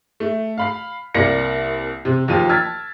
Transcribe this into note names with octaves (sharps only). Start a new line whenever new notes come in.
A3
F5 B5 C7
C2 A#3 D5 A#6 C#7
C3
D#2 F3 F4 G4 D#7
A5 E6 F6 G#6 A6 B6